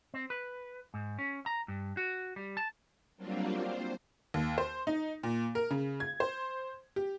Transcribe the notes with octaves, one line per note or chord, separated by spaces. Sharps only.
C4
B4
G#2
C#4
A#5
G2
F#4
G3
A5
F#3 G3 A#3 C4 D4 F4
C5
D#2
C5
D#4
A#2
A#4
C#3
G#6
C5
G4